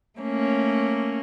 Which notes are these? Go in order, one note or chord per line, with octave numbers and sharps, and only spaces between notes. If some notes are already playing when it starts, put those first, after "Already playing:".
A3 A#3 C#4